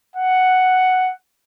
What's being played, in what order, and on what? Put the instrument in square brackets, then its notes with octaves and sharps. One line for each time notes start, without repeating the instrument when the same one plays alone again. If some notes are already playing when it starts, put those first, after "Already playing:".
[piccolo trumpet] F#5